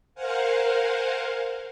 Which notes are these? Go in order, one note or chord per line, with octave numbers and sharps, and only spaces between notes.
A#4 C5 F5 F#5 G#5